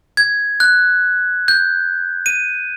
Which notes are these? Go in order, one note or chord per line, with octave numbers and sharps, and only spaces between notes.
G#6
F#6
G6
D#7